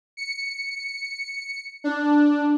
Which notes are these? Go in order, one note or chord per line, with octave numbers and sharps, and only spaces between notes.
C#7
D4